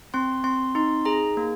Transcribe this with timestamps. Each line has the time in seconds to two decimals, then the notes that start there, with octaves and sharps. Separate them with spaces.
0.14 C4 C6
0.44 C4 C6
0.75 D#4 C6
1.05 G#4 A#5
1.37 A#3